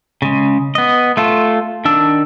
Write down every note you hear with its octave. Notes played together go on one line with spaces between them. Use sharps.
C#3 G#3
B3 D#5
A3 F4 A4
D#3 D4 E6